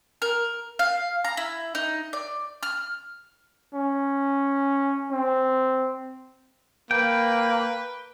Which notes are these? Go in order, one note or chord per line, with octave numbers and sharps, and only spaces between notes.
A#4
F5
A#5
E4
D#4
D5
F6
C#4
C4
A#3 B4 G5